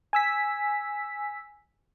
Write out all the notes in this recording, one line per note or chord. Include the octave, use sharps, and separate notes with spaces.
G#5 E6 B6